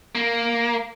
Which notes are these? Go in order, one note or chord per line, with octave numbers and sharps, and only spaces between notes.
A#3